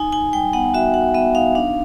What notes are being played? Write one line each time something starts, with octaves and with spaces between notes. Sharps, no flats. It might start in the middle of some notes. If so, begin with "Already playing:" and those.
Already playing: D#4 G#5
D#4 G#5
G3 G5
B3 F#5
F#4 E5
F#4 F#5
B3 E5
D#4 F5
D4 F5